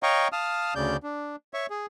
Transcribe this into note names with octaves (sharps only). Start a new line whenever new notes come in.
C#5 D#5 F5 G5 A#5 C#6
F5 A5 D#6 F6
D2 C#3 D5 G6
D4
C#5 E5 C#6
G#4